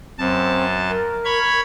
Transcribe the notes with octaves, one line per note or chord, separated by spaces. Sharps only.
F#2 C4 A5
A#4
C#5 B5 G#6